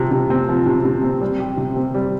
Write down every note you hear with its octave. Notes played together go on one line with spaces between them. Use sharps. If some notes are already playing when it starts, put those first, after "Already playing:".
Already playing: C3 F3
C3
C4
F3
C3
C3
C4
G3
G4
C3
C4
G3